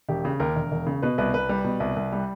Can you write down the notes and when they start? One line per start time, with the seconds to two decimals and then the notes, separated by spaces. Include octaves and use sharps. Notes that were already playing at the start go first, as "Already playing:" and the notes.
0.09 E1 G4
0.25 C#3
0.40 D#2 A#4
0.56 E1
0.72 E1
0.87 C#3
1.03 B2 B4
1.18 C2 B4
1.34 C2 B4
1.49 G3
1.64 B2
1.80 C2
1.96 C2
2.12 G3